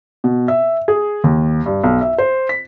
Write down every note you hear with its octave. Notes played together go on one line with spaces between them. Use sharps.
B2
E5
G#4
D#2
G2
B1
E5
C5
B6